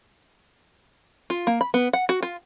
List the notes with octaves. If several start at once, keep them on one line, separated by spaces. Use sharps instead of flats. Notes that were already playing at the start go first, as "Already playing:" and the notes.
F4
A#3
B5
B3
F#5
F#4
F4